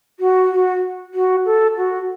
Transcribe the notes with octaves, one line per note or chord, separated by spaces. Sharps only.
F#4
F#4
F#4
A4
F#4